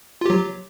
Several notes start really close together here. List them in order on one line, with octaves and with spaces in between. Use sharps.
F4 G4 F#3